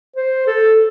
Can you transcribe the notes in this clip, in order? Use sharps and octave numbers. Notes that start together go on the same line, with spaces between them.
C5
A4